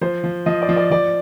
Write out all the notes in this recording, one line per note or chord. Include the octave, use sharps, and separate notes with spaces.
F3 C5
F3
F3 D#5
D5
F3
D5
F3 D5